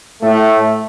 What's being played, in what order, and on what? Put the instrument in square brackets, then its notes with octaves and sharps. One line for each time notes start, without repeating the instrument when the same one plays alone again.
[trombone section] A2 A3